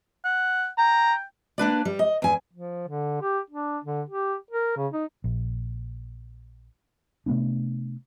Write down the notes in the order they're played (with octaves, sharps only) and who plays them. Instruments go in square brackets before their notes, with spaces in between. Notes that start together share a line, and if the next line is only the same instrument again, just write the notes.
[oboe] F#5
[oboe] G5 [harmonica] A#5
[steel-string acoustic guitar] A#3 D4 B4 D5
G3
D#5
E2 G#5
[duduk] F3
D3
G4
D4
D3
G4
A#4
C#3
D#4
[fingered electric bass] A#1
C3 A3 B3 D4